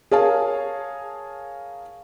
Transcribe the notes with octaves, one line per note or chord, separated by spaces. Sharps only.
G#4 A#4 C#5 F5 G#5 A5